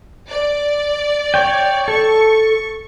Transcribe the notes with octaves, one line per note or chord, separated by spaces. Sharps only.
D5
C#5 G5
A4 C#6